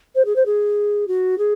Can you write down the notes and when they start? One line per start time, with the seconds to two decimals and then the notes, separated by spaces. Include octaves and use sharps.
0.15 C5
0.25 G#4
0.36 C5
0.46 G#4
1.08 F#4
1.38 G#4